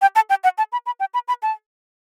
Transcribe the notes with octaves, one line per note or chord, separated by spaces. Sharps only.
G5
A5
G5
F#5
A5
B5
B5
G5
B5
B5
A5